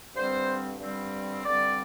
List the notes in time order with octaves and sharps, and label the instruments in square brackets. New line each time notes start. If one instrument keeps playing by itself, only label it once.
[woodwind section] G2 D3 G3 C4 C5
G2 D3 G3 C4
G2 D3 G3 C4 D5